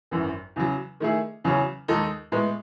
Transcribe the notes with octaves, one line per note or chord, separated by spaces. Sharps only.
G#1 F#2 E3
E2 C#3 F#3
D#3 A3 E4 G#4
E2 C#3 F#3 C#4
D#2 D#3 G#3 D#4 A4
A2 G#3 B3